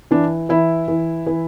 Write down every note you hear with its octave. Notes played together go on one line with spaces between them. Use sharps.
E3 D4
E3 E4
E3
E3